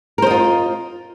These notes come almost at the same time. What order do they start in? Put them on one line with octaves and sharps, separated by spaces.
A#4 C5 D#5 F4